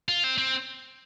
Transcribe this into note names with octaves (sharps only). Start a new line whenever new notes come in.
F4
C4
C4